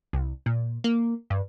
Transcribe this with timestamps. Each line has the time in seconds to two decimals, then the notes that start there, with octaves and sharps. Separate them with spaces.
0.13 C2
0.46 A#2
0.84 A#3
1.30 G2